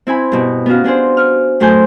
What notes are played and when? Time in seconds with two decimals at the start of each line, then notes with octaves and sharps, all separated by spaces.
0.07 C4 E4 G#5 B5
0.32 G2 B2
0.66 B3 C#4 F#4 F5
0.84 B3 D4 G#4 C5
1.17 F6
1.60 F#2 A2 A3 C5 G#5 G6